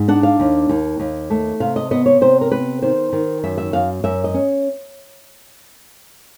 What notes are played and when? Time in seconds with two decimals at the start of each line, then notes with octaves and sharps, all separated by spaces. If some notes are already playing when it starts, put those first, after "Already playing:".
Already playing: G#2
0.08 D4 F#5
0.23 F5
0.40 D#2
0.69 D#2
1.00 D#2
1.30 A3
1.60 C3 F5
1.76 D#5
1.91 B3 D#5
2.06 C#5
2.21 C3 C5
2.41 A#4
2.51 B3 B4
2.82 D#3 C5
3.13 D#3
3.44 F#2 E5
3.58 E5
3.73 F#2 F5
4.04 F#2 E5
4.24 D#5
4.34 C#4